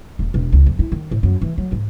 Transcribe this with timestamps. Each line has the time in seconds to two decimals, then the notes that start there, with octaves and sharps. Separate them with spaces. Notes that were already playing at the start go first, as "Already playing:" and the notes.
0.19 D#1
0.34 E1
0.52 C#2
0.66 F2
0.79 E4
0.92 D#3
1.11 A2
1.23 F#2
1.42 E3
1.58 F#3
1.72 G#2